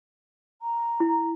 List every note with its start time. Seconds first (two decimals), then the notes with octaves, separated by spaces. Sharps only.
0.61 A#5
1.00 E4